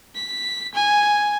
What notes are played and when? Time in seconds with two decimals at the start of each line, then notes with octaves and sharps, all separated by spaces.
0.15 B6
0.74 G#5